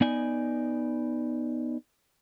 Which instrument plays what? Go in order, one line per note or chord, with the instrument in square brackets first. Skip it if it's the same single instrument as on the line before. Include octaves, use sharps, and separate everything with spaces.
[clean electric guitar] B3 D#4 D5 G#5